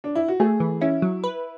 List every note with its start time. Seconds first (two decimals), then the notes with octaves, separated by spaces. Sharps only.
0.04 D4
0.15 E4
0.28 F#4
0.40 A3 G#4
0.60 E3
0.81 C#4 E4
1.02 F#3
1.24 B4